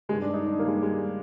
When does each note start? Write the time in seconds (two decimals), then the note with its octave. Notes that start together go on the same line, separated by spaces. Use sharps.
0.09 D#3 G#3
0.13 G2
0.22 D4
0.34 D#4
0.46 D4
0.59 G2 D#3 A#3
0.68 G#3
0.75 G3
0.83 G#3